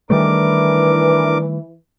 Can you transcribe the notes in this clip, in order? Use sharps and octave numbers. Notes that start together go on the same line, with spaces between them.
D#3 E3 G3 A3 D4 A#4 D6